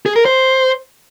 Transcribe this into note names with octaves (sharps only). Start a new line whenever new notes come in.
G#4
A#4
C5